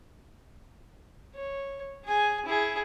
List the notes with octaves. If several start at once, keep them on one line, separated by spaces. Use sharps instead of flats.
C#5
G#4 G#5
E4 G#4